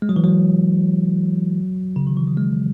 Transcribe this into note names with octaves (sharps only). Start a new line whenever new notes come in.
G#3
F#3
E3
F#3
C#3
D#3
E3
F#3
G#3